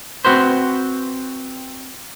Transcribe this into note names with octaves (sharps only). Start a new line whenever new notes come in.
C4 F#4 B4 C5